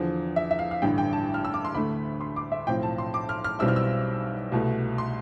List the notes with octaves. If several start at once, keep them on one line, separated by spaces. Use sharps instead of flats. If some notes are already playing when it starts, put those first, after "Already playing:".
Already playing: E2 D3 F3
E5
E5
F5
F5
A1 G2 D3 G5
G5
A5
F6
E6
D6
C6
D2 D3 A3 B5
C6
D6
E5
B1 A2 F3 C4 G5
A5
C6
D6
F6
F6
B1 B2 G3 C4 E4 E6
F6
E6
C2 B2 A3
C6